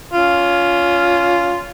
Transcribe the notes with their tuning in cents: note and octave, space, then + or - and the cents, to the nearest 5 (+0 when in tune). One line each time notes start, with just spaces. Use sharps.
C#4 +25 F4 +0